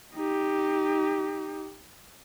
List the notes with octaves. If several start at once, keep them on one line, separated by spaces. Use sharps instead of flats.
D#4 G4